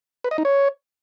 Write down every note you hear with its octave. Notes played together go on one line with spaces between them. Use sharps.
B4
D#5
D#4
C#5